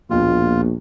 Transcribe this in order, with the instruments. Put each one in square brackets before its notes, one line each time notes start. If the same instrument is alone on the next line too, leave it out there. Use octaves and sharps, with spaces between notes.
[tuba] A#1 [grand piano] D#2 B2 [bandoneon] F4